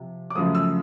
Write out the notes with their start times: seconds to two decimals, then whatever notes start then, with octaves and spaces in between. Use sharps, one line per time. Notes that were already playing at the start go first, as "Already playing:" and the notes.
Already playing: C3 F3
0.30 D6
0.35 F#2 C#3 F3 A3 D#6
0.55 E6